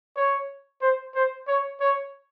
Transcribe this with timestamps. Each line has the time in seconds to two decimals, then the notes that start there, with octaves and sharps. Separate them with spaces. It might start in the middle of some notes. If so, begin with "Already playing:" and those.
0.16 C#5
0.81 C5
1.15 C5
1.47 C#5
1.80 C#5